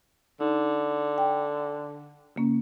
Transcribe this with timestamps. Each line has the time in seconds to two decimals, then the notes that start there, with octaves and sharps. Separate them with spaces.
0.40 D3 D#4
1.18 G5
2.36 C#3 A#3 C#4